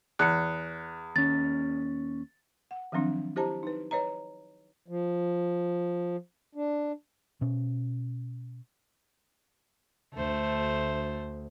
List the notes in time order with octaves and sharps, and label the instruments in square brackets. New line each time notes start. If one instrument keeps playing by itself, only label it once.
[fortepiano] E2 [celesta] F#6 C#7
[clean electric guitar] D#2 C#4 [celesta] A6
[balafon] F#5
D#3 F3 F#3 C4 D4
E4 G4 C5 D#5 A5 A#5
D#4 B4
B4 C#5 D#5 A#5
[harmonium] F3
D4
[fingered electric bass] B2 C#4
[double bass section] D2 [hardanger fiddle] A3 C5